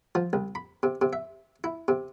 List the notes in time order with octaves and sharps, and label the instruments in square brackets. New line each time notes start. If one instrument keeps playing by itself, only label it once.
[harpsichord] F3
C2
B5
C3
C3
E5
E4
C3